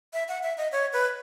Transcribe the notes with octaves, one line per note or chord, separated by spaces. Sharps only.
E5
F#5
E5
D#5
C#5
B4